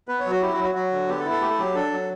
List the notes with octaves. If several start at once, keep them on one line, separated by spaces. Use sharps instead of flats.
B3 B4
C#5
F#3
F#4
E4 G4
F#4
F#3
F#4
F#3 F#4
D3
B3 G4
A4
E4
A4
A3 G4
A4
F#3 G4
D4 A4
F#3